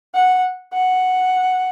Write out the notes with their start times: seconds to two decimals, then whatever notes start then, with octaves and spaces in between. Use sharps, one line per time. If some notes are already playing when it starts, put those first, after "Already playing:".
0.15 F#5
0.73 F#5